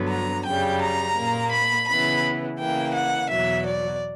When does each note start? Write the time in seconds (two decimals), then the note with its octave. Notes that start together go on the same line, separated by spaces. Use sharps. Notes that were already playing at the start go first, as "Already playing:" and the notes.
Already playing: G2 D3 F#3 B3
0.10 A#5
0.46 F#2 C#3 G3 G5
0.82 A#5
1.17 A#2 A#3
1.52 B5
1.88 C#3 E3 B3 B5
2.59 C#3 E3 A#3 G5
2.94 F#5
3.30 E2 B2 F#3 E5
3.66 D5